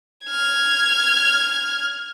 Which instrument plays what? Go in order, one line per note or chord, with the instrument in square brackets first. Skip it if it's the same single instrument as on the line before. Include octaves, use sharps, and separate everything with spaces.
[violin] F6 G#6